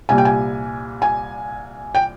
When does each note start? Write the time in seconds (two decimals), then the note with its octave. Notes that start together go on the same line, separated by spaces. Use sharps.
0.09 C2 A#2 G3 G#5
0.18 G5
0.25 G#5
1.02 G#5
1.95 G5